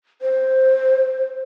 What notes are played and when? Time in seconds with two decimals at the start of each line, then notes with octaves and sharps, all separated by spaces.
0.22 C5